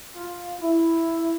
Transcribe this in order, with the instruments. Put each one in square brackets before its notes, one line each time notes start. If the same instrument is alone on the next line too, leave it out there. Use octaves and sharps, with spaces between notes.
[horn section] F4
E4